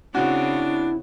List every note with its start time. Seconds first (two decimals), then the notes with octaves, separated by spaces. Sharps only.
0.15 C#3 C4 D4 E4 F#4